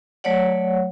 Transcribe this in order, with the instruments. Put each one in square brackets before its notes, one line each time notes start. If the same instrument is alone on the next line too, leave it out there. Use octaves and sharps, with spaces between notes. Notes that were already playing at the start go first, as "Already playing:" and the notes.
[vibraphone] F#3 A3 C#5 D5 F#5